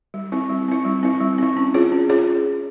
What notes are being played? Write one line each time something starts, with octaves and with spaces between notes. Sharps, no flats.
G3
C4 E4
G3
C4 E4
G3
C4 E4
G3
C4 E4
C#4
F4 G#4 C#5
C#4
F4 G#4 C#5